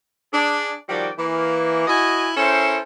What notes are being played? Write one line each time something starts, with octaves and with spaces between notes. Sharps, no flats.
D4 G#4
D#3 F3 G3 F#4 D5 G5
E3 A#3
E4 F#4 D#5 G#5
C#4 E4 A4 A#4 C5